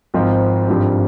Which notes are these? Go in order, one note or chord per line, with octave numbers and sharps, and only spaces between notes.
G#1 G#2 F3 C4 F4
G#1 G2 F3 C4 G4